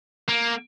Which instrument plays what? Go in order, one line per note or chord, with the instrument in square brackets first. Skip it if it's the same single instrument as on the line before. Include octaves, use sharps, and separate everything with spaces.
[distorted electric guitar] A#3